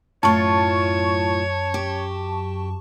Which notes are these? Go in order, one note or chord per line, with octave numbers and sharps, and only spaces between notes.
F#2 A2 F4 C#5 A5 C#6
G4